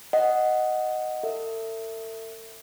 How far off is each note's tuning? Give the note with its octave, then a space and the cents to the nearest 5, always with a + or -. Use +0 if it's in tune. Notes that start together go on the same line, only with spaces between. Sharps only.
D#5 +0 F#5 +0
A4 +40 E5 +0